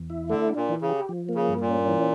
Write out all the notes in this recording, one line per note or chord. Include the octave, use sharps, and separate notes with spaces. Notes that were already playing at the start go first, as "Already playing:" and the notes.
Already playing: E2
E4
D3 A3
D4
A#2
E3
C#3
G4
F3
A#3
C#3
G2
A#2
C#4
E3